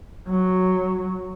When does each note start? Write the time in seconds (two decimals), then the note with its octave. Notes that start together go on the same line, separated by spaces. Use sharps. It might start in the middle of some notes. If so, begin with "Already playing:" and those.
0.29 F#3